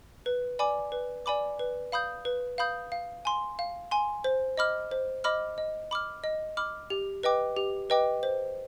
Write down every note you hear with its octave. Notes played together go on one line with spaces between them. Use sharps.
B4
D5 G#5 B5 D6
B4
D5 G#5 B5 D6
B4
F5 B5 D#6 G6
B4
F5 B5 D#6 G6
F5
G#5 C6
F5
G#5 C6
C5
D#5 B5 D6 F6
C5
D#5 B5 D6 F6
D#5
B5 D6 F6
D#5
B5 D6 F6
G4
B4 D#5 G5 D6
G4
B4 D#5 G5 D6
C5